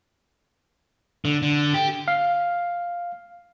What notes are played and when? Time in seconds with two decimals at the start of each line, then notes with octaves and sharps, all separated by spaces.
1.25 D3
1.42 D3
1.74 G4
2.08 F5